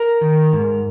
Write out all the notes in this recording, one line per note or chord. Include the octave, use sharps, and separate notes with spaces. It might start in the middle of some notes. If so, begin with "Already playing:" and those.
Already playing: A#4
D#3
G#2